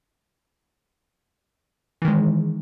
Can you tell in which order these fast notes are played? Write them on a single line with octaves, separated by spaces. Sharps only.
E3 D#3 G#3